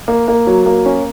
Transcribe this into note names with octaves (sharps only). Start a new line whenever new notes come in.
A#3
A#3
F#3
A#3
C#4